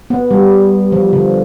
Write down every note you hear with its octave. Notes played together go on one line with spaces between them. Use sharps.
B3
G3
F3
D3